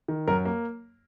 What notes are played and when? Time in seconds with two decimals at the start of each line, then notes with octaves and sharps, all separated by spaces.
0.08 D#3
0.28 F#2 A#4
0.45 A#3